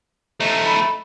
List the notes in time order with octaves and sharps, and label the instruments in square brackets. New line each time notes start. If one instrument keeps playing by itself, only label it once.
[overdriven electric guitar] A3 D#4
[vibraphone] B5